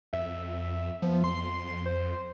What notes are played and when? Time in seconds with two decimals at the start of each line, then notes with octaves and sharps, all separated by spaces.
0.13 F2 E5
1.02 F3 B3
1.24 F2 C6
1.86 C5